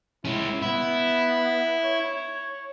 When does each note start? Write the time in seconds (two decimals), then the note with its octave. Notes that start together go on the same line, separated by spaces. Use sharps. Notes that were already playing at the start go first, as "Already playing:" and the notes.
0.25 G#3 C#4 E4
0.62 B3 E4
1.84 C#5